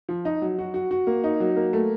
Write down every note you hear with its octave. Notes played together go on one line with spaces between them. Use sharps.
F3
D#4
F#3
F#4
F#4
F#4
A#3
D#4
F#3
A#3
A3